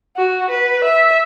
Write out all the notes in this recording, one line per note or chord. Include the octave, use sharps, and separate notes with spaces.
F#4
B4
E5